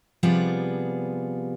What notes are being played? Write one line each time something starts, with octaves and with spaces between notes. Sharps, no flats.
C3 F3 G3 B3 F4 G#4